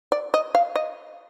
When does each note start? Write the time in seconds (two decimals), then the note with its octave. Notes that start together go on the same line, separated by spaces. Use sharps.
0.12 D5
0.34 D#5
0.55 F5
0.75 D#5